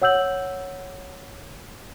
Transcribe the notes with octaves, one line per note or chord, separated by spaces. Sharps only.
C#5 F#5 E6 G6 F#7